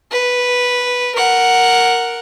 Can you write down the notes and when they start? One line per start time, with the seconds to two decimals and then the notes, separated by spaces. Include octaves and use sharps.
0.12 B4
1.15 A#4 F#5